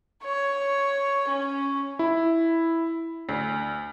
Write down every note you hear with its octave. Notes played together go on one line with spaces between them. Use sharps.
C#5
C#4
E4
D2